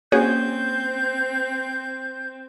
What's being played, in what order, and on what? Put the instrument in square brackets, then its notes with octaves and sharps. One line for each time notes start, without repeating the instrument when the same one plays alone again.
[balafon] A#3 C#4 C#6 [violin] C4 [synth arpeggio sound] F#4 G#4 C#5 [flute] G6